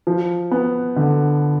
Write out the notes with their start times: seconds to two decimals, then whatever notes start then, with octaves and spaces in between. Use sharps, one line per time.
0.07 F3
0.51 B3
0.96 D3